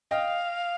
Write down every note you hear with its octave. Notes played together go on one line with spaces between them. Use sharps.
D#5 F5 G5